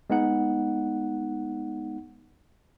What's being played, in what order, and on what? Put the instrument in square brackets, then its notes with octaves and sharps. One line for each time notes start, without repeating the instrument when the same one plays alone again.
[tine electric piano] G#3 B3 D#4 F#5